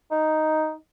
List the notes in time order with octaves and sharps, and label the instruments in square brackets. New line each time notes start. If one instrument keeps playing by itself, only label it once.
[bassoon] D#4